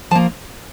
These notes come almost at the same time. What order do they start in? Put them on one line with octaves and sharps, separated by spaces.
F3 A5 A#3